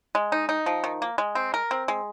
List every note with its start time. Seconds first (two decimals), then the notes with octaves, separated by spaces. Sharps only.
0.15 G#3
0.32 D#4
0.49 D#4
0.66 F3
0.84 D#3
1.02 A#3
1.18 G#3
1.35 C4
1.54 A#4
1.71 C4
1.88 G#3